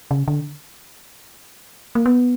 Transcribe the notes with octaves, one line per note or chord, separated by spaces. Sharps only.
C#3
D3
A#3
B3